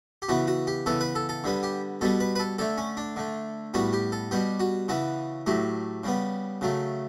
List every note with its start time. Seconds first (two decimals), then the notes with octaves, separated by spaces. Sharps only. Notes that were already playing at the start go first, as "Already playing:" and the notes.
0.22 G4
0.29 C#3 E3 B3 F#4
0.47 F#4
0.67 G4
0.86 C#3 E3 B3 A4
1.01 B4
1.15 A4
1.29 A4
1.44 D3 G3 B3
1.63 G4
2.01 B2 G3 B3 A4
2.20 B4
2.36 B4
2.40 A4
2.59 D3 A3 A4
2.78 C#4
2.97 D4
3.16 D3 A3
3.74 A2 G3 B3 F#4
3.93 G4
4.12 A4
4.31 B2 G3 B3 G4
4.60 F#4
4.88 C#3 E3 B3 F#4
5.46 A2 F#3 A3 G4
6.04 C#3 G3 B3
6.61 C#3 F#3 A3